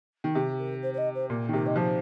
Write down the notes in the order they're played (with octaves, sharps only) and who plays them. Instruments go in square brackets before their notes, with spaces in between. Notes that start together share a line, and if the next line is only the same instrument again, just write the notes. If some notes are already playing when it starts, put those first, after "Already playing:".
[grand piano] D#3
[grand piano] C3 [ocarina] G4
[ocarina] A#4
C5
C5
D#5
C5
[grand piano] A#2 [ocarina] A#4
[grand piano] D#3
[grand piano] C3 [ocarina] A#4
[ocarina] D#5
[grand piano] F3 [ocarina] C5